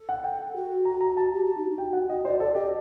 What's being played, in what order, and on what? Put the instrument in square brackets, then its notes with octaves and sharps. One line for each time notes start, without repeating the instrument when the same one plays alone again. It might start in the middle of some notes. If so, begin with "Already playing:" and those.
Already playing: [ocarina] A4
[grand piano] F#5
G5
[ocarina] F#4
[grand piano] A#5
A#5
[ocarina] F#4 [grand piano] A5
[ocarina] G4
F#4
D#4
F#4
[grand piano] G5
F#5
[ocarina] F#4 [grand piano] D#5
[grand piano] C5 [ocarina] D5
[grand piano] A4 [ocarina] D5
[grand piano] G4 [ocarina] D#5